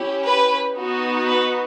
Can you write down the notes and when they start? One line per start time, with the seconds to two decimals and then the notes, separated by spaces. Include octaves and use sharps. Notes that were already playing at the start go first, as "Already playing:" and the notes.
Already playing: C#4 E4 G4
0.24 B4
0.76 B3 D#4 F#4
1.27 B4